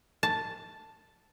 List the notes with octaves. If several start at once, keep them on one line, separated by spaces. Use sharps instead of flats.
A5